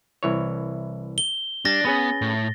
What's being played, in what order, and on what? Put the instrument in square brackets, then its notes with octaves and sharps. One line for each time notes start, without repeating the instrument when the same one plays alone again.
[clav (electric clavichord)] C2 E3 C#5
[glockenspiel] G7
[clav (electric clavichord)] G3 [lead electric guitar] D4 [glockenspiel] A6 A#6
[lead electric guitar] B3 [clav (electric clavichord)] C#4 G#4 B4
[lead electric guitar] A2